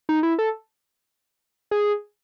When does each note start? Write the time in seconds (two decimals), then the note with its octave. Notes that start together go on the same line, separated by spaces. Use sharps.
0.09 D#4
0.23 E4
0.39 A4
1.71 G#4